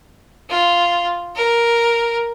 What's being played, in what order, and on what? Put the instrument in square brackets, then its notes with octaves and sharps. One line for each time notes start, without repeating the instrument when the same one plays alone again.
[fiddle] F4
A#4